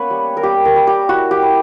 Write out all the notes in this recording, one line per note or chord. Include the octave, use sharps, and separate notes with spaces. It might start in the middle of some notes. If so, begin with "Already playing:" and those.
Already playing: A#3 B3 C#4 B4 C#5
G3
A#4
G3 G4
A#4
G3
G4
E4 F#4
G4
E4